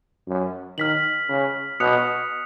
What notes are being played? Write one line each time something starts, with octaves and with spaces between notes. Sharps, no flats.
F#2
D#3 F6 B6 F#7
C#3
B2 D#6 F#6 C#7 F7